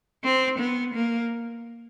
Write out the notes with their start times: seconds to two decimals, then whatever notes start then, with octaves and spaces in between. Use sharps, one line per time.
0.24 C4
0.59 B3
0.94 A#3